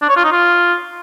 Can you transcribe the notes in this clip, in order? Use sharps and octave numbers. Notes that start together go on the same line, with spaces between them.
D4
C#5
F4
D#4
F4